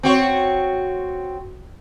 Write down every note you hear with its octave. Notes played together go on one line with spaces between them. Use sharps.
C4 F#4 C#5